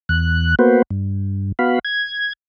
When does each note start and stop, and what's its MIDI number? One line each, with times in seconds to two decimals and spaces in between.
0.09 0.55 40
0.09 0.55 90
0.59 0.82 58
0.59 0.82 59
0.59 0.82 66
0.59 0.82 71
0.59 0.82 72
0.91 1.52 43
1.59 1.79 59
1.59 1.79 66
1.59 1.79 77
1.59 1.79 83
1.85 2.33 92